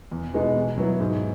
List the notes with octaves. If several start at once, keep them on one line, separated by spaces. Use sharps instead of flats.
E2
B2 G#3 B3 D#4
B2
F#3 B3 E4
G#2